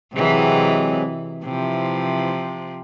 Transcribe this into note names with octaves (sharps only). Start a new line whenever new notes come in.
C3 E3 F#3 G#3 C4
C3 E3 F3